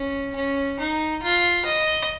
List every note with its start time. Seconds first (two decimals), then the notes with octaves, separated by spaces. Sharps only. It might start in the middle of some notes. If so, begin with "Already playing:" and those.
Already playing: C#4
0.35 C#4
0.79 D#4
1.22 F4
1.66 D#5